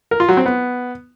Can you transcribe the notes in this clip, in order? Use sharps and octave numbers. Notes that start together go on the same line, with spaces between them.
A#4
F4
F#3
C4
B3